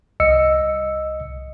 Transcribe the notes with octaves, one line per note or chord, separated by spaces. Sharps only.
C2 D#5 E6 C#7